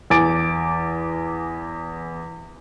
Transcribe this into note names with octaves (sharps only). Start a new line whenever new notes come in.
E2 G#5 D6 A6 D7